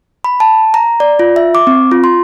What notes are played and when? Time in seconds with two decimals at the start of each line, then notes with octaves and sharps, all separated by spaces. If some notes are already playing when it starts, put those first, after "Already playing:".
0.24 B5
0.40 A5
0.74 A#5
1.00 D5
1.19 F4
1.36 E5
1.55 D6
1.67 C4
1.91 F4
2.04 C6